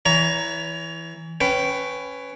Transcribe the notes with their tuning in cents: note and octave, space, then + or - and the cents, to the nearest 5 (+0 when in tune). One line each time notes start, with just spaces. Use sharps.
E3 +0 C#5 +35 A#5 +0
C#4 +0 B4 +15 G5 -15